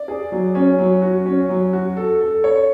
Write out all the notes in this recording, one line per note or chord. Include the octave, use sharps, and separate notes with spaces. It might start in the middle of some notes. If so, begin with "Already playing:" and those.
Already playing: D5
G#4
F#3
C#4
F#3
F#4
C#4
F#3
F#4
A4
A4
C#5